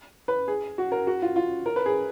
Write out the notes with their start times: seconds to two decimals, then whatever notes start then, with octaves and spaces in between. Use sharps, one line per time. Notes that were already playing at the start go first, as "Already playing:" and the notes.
0.28 B4
0.48 G#4
0.78 F#4
0.92 A#4
1.07 F#4
1.22 F4
1.36 F4
1.66 A#4
1.76 B4
1.86 G#4